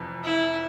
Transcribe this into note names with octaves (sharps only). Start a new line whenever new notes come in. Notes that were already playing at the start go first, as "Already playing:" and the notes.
Already playing: F1 F2 E3
E4